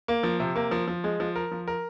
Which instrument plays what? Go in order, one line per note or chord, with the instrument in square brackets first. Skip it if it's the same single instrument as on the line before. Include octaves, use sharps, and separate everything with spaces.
[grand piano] A#3
F3
C3
A#3
F3
F3
G#3
F3
A#4
F3
A#4